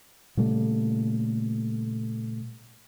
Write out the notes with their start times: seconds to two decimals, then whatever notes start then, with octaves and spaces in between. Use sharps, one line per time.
0.37 A#2 C#3 G3 A3